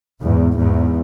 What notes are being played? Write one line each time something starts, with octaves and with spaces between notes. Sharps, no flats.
E2 G#2
E2 G#2